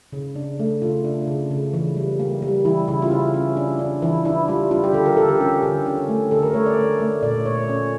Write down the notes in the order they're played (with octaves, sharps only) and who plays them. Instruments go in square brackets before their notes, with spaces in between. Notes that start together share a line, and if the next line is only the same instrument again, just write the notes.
[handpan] C#3
D4
A3
C#3 F4
D4
C#3
C#3
E3
G3
A#3
G3
E3 E4
C#3 E4
F4
C#4 E4
C#4
D4
D4
E3 E4
D4 E4
G3 F4
D4 F4
G4
D3 A4
A#4
D3 A4
G4
C#4
D3
C#4
A3
D3 A4
A#4
A3 C#5
D5
A3
A3
A#2 D5
A#2 C#5
C#4